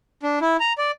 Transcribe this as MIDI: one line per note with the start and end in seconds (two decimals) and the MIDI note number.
0.23 0.39 62
0.41 0.57 64
0.60 0.73 82
0.78 0.91 74